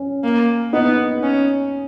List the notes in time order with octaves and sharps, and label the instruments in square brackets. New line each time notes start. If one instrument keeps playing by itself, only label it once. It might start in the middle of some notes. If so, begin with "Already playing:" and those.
Already playing: [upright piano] C#4
[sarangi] A#3
[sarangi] B3 [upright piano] D#4
[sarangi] C#4